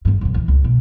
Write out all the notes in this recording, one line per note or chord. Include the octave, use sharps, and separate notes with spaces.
E2 G2
F#2 C3
E3 F#3
C#2
B2